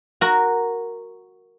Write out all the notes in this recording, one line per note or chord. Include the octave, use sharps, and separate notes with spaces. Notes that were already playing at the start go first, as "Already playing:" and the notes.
F#4 A#4